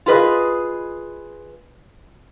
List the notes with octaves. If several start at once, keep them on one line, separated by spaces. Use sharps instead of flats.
F4 G#4 B4 D#5